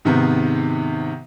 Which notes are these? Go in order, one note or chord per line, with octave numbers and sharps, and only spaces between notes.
G#2 C3 D#3 B3